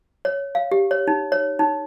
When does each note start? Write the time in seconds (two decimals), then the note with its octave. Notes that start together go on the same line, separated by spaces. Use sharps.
0.25 C#5
0.55 F5
0.72 G4
0.91 C#5
1.07 D#4
1.32 C#5
1.59 D#4